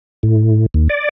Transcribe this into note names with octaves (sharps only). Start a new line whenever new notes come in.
A2
D#2
D5